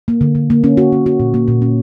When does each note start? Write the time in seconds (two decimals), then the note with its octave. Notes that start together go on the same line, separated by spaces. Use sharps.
0.08 A#3
0.21 D3
0.35 D3
0.50 A#3
0.64 C#4
0.77 F#4
0.92 C#4
1.06 F#4
1.20 A#2
1.34 A#3
1.48 A#2
1.62 C#4